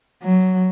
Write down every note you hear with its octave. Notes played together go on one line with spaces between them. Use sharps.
F#3